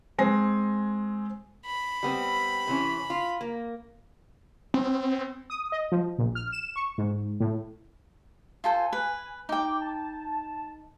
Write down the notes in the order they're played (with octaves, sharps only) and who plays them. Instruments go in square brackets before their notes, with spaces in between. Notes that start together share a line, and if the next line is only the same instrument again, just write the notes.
[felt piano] G#3 C4 G#5 A#6 C7
[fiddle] B5
[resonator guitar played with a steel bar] G3 B3 C4
C3 E3 C#4
F4
A#3
[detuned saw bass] C4
[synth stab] D#6
D#5
F3
A#1
F6
E7
C#6
G#2
A2
[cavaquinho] F4 A4 C5 [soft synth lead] G#5
[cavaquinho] B4
[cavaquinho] D#4 G5 [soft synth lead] D6
[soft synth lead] A5